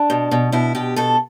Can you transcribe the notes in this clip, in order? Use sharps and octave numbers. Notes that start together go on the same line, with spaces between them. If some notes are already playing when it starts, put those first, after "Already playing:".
Already playing: D4
B2
B2
B2 E4
B2 G4
B2 A4